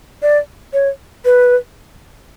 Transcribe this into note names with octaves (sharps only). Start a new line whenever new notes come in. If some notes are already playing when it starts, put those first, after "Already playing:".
D5
C#5
B4